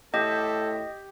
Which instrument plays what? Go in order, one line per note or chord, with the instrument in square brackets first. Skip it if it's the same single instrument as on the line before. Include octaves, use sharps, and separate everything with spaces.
[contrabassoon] A2 [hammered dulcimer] G4 [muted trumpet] A4 [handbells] D#5